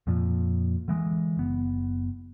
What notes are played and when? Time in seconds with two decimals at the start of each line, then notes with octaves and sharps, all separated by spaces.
0.07 F2 A#2 F3
0.88 D3 E3 G#3
1.37 F#1 B3